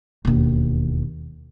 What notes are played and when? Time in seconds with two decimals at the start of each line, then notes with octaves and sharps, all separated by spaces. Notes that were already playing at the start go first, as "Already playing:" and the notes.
0.25 E1 D#2